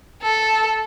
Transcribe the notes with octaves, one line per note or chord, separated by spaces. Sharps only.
A4